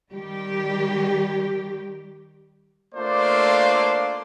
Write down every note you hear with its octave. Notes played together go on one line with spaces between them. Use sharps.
D#3 G3 G4
A3 A#3 D4 F4 C5 D5